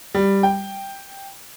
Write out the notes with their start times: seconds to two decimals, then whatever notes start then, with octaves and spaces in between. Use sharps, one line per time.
0.14 G3
0.43 G5